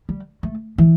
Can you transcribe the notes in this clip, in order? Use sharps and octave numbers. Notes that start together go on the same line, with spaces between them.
G3
A3
E3